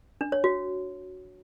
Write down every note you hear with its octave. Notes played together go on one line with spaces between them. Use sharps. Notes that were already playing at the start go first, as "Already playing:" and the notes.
D4
C#5
F#4